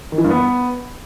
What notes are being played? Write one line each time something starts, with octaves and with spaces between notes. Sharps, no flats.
D#3
E3
G2
B3